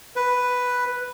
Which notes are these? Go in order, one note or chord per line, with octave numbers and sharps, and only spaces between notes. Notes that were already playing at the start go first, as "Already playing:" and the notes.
B4